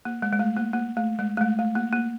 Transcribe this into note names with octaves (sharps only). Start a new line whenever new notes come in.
A#3
G#3
G#3
A3
A#3
A#3
A3
G#3
A3
G#3
A3
A#3
A#3